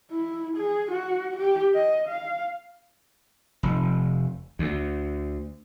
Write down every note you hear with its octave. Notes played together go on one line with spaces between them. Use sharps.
E4
G#4
F#4
G4
D#5
F5
F1
D2